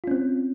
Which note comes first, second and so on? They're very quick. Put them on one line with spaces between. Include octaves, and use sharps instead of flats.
F4 C#4 C4